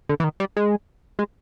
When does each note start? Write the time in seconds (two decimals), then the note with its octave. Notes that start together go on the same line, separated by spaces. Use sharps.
0.09 D3
0.20 E3
0.24 D#3
0.40 G3
0.57 G#3
1.19 G#3